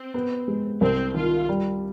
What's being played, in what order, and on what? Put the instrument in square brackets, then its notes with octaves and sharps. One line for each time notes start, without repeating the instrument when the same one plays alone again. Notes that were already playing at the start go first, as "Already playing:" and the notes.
Already playing: [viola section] C4
[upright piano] B3
G#3
[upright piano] C2 [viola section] C4
[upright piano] D#3 [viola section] F4
[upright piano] G3